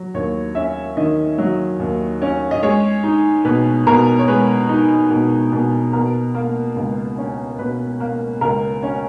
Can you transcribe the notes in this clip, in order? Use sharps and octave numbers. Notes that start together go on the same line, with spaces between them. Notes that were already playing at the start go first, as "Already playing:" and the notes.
Already playing: F#3
D#2 C#5
C#4 E5
D#3 D#5
F#3
D#2
C#4
D#5
G#3 C#5
D#4
B2 B4
B2 A#4
C#5
G#3 B4
D#4
B2
B2
B2 A#4
A#3
C#2
C#4
B2 B4
A#3
C#2 A#4
C#4